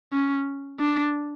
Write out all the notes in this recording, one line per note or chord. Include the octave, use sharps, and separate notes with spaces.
C#4
D4